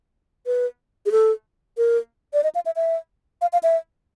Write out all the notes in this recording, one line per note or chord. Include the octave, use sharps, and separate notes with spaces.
B4
G#4
A4
A#4
D5
D#5
F5
E5
E5
F5
F5
E5